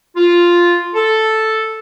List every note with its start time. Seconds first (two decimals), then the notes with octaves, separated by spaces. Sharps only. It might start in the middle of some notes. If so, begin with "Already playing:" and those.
0.17 F4
0.95 A4